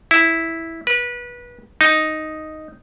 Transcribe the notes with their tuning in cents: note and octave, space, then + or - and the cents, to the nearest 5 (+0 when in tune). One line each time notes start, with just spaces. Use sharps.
E4 -10
B4 -25
D#4 +0